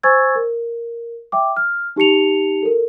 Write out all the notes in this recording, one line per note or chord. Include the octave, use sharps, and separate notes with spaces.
C5 G#5 C#6 E6 G#6 A6
A#4
E5 G5 D6
F6
D#4 G4 A5 C#7 F7
A4 A#4